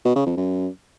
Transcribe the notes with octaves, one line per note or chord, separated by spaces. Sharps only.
B2
C#3
F2
F#2